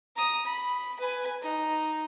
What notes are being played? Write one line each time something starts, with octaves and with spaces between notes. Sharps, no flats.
A#5 D#6
B5
B4 G#5
D#4